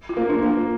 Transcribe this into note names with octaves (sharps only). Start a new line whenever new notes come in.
F4
A#3
D4
A#3
F4